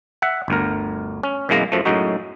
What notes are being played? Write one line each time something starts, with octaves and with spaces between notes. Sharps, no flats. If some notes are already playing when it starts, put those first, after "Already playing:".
E5 F#5
G1 D2 A#4
C#4
F#2 B2 E3 G#3 A#3 A#5
F#2 F3 A3
F#2 A2 G#3 D#4 F#4